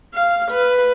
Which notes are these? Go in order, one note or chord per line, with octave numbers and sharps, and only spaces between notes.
F5
B4